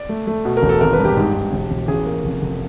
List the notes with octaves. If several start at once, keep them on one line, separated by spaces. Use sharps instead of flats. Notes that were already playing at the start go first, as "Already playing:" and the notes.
Already playing: D5
A3
A3
B2
A#4
E1
A4
G#1 A#4
B4
G2
G4
G#2
G#2
E1
E1
A1 G#4
A#3
F1
F1